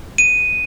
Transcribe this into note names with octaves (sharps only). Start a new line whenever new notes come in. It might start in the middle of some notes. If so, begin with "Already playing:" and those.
D#7